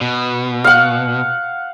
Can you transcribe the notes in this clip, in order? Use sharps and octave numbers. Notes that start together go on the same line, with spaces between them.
B2
F5 F#5